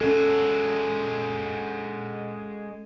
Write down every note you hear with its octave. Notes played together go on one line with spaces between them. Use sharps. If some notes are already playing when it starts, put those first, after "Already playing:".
G#3 C#4 F#4 A4